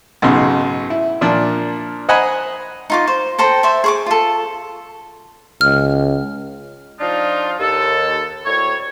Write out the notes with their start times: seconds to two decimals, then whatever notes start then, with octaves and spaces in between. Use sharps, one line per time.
0.22 B1 G#2 C#3 C6
0.90 E4
1.21 A#2 F3 D4
2.09 C5 D#5 F#5 G#5 A#5 B5
2.90 D#4 F4 D6
3.07 C5
3.39 A4 C5 G5 A#5
3.63 C5 D5 E5
3.84 G#4 C#6 D6
4.06 F4 A4
5.61 C#2 F6
7.00 F3 D4 D#4 F4
7.60 D#2 A4
8.46 D2 A2 C#5